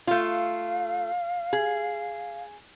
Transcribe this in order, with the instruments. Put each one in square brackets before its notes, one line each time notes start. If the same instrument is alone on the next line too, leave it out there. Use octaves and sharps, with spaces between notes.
[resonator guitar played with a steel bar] A3 F4 [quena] F5
[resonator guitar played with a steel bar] G#4